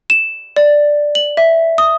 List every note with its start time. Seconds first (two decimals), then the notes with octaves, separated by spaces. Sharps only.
0.10 E7
0.56 D5
1.15 F#7
1.37 E5
1.78 D#6